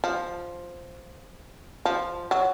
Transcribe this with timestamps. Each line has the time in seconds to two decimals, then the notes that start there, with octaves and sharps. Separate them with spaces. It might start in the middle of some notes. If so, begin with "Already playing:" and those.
0.04 F3
1.85 F3
2.31 F#3